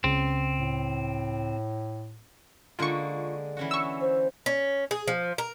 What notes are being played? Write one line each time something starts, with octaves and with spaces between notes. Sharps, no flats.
C#2 C#3 C4
A2
D3 G#3 A#3 F4 C#6
E3 C#4 F#4
C#6 E6
C5
C#4
G#4
F3
A#4